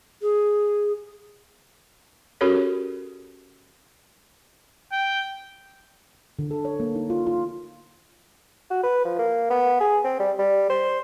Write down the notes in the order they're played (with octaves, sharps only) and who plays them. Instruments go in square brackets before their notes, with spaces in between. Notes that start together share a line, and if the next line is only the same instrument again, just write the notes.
[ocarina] G#4
[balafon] C#4 F#4 G4 A4 A#4 C#5
[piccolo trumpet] G5
[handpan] D3
A4
C#5
A#3
D#4
F4
F4
[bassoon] F#4
B4
F3
A#3
B3
G#4
C4
G3
G3
C5